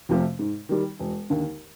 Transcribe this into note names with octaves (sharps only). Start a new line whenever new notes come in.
F2 C3 F3 A3
G#2
D#3 G3
E1
D#2 D3